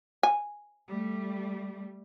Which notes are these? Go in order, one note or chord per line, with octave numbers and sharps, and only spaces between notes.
G#5
G3 A3